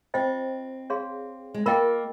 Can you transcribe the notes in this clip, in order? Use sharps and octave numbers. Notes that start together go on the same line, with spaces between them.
C4 F4 C5 D#5 G5
G#4 C#5 F5 C6
G#3
A#3 F4 A#4 D#5 G5